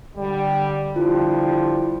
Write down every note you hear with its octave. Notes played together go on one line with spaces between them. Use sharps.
D3 G3
D3 F3 G3 E4 F4